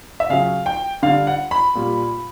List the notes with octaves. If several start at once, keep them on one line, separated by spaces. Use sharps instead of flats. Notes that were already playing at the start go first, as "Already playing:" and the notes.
E5
C#3 F#3 F5
G5
D3 G3 F5
F#5
B5
A#2 G3